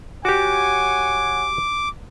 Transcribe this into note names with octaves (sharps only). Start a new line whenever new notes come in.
F#4 G4 C#5 F#5 G#5 D6